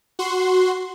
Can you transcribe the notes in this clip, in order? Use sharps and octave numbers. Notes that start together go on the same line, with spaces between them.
F#4 C6